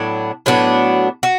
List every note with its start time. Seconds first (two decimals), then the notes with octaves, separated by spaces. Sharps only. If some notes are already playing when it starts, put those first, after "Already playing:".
Already playing: A2 F#3 B3 D4
0.46 A2 F#3 B3 D4
1.23 F#4